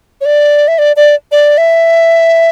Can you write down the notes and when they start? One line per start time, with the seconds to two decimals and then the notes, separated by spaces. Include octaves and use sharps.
0.21 C#5
0.25 D5
0.68 E5
0.78 D5
0.96 D5
1.32 D5
1.58 E5